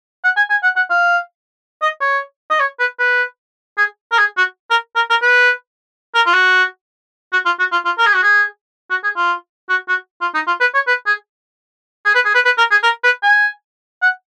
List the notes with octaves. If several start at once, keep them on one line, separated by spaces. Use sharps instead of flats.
F#5
G#5
G#5
F#5
F#5
F5
D#5
C#5
D#5
C#5
B4
B4
G#4
A#4
G#4
F#4
A#4
A#4
A#4
B4
A#4
F4
F#4
F#4
F4
F#4
F4
F4
A#4
G#4
F#4
G#4
F#4
G#4
F4
F#4
F#4
F4
D#4
F4
B4
C#5
B4
G#4
G#4
B4
G#4
B4
B4
A#4
G#4
A#4
B4
G#5
F#5